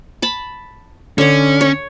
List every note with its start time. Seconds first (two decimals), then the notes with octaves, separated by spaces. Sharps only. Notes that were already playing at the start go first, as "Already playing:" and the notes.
0.22 A5 B5
1.18 D3 C#4 C#5
1.61 C#5